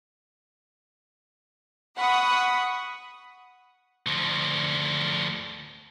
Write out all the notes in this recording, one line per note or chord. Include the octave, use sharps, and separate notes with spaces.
F#5 B5 C#6 D#6
D2 F3